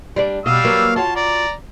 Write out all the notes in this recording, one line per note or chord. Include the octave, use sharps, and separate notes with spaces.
G3 D4 D5
B2 G3 D#5 F5 E6
F#3 A#3 B4
F4 F#4 C#5 A5
D5 A#5